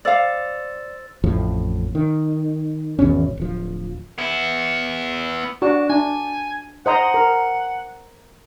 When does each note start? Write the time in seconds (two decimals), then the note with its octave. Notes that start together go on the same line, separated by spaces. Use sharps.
0.05 C5 D5 F5 E6 A6
1.24 A1 F2 A2 F3
1.95 D#3
2.99 G#1 E2 B2 C#4
3.37 D1 F3
4.18 B3 E4
5.62 D4 F#4
5.90 D4 G#5
6.86 C5 D#5 F#5 A#5
7.14 A#4